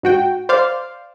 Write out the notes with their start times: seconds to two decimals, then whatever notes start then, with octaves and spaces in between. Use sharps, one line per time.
0.03 G#2 F#4 G5
0.49 C5 D5 F5